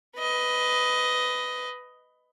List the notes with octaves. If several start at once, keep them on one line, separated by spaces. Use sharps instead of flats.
B4 D#5